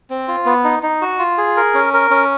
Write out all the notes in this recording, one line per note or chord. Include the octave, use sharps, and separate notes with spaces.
C4
F4
B3
D#4
D#4
F#4
F4
G#4
A#4
C#4
A#4
C#4